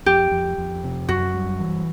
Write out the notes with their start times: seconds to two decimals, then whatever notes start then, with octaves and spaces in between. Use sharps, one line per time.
0.06 F2 G4
0.32 F2
0.58 F2
0.84 C3
1.08 F#2 F#4
1.34 G3
1.59 E3